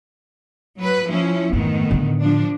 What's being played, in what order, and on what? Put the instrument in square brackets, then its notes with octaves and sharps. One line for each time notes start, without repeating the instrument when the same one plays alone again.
[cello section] F#3 B4
F3 C#4 E4
[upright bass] F2 G#2 [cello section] D#3 A3 B3
[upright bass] A2 D3
[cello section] F3 D4